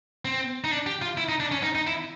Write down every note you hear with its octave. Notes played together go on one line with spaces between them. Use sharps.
C4
D#4
D4
G4
F4
E4
D#4
D4
C#4
D#4
D#4
E4